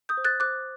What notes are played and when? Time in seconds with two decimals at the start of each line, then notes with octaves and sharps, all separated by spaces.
0.09 D#6 G6
0.17 C5
0.25 F#6 A6
0.40 C5 D6 F#6